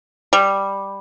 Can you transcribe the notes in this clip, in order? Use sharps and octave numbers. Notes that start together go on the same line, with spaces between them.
G3